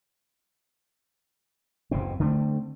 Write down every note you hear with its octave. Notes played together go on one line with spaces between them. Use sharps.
F#1 E2 B2 C4
D3 A3 C4